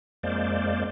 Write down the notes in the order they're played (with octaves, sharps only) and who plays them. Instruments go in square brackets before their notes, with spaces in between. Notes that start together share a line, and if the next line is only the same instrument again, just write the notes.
[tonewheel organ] F2 G#3 A#3 C5 D5